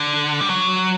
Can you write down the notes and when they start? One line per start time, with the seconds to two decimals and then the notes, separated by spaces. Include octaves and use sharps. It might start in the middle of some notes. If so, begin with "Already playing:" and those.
Already playing: D3
0.41 G3
0.50 F#3